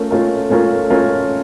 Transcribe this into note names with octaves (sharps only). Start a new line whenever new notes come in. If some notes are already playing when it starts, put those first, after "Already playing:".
Already playing: A3 C#4 F4 A#4
A3 C#4 F4 A#4
A3 C#4 F4 A#4
A3 C#4 F4 A#4